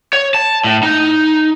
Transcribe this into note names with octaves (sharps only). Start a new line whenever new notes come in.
C#5
A5
A2
D#4